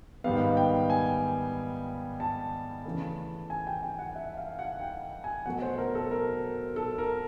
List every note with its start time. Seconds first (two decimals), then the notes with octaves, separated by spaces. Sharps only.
0.24 G#2 D#3 G3 B3 F5
0.57 G5
0.90 G#5
2.20 A5
2.85 C#3 E3 A3
3.50 G#5
3.67 G5
3.83 G5
3.99 F#5
4.16 E5
4.37 F5
4.59 F#5
4.80 G5
5.24 G#5
5.46 B2 F#3 A3 F#5
5.62 C5
5.78 A#4
5.95 A4
6.11 A#4
6.76 A4
6.98 A#4